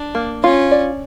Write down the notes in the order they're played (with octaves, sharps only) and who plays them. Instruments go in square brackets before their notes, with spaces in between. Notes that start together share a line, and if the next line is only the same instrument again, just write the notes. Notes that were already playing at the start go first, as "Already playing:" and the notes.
Already playing: [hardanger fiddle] D4
[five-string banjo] A#3
[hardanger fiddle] C#4 [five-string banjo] F4
[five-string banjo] D5